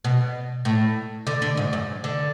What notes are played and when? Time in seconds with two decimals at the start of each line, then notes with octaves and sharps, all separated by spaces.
0.04 B2
0.65 A2
1.27 D3
1.42 D3
1.57 G#2
1.73 F#2
2.04 D3